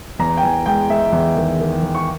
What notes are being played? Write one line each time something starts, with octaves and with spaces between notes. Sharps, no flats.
E2 A#5
G5
E2 G#5
G#3 G5
G#3 E5
E2
D#3
D#3
D#3
C#6